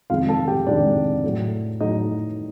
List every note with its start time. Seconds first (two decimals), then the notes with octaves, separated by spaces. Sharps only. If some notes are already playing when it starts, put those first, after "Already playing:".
0.10 F2 C3 D#3 G#3 F4 F5
0.28 A4 A5
0.47 G4 G5
0.66 F2 C3 D#3 G#3 D4 D5
1.24 A2 F#3 A3
1.80 A2 F#3 A3 D#4 D#5